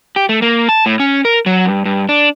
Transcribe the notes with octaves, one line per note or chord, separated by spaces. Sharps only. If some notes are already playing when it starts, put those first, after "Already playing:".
G4
A3
A#3
A5
A2
C#4
A#4
F#3
G2
G2
D4